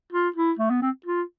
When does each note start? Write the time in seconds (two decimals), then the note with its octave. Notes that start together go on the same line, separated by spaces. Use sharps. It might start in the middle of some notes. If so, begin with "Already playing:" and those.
0.13 F4
0.36 E4
0.59 A3
0.70 B3
0.82 C4
1.06 F4